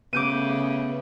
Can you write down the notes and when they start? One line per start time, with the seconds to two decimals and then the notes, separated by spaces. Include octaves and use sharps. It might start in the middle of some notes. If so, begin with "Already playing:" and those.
0.13 C#3 A3 B3 D6 G6 D#7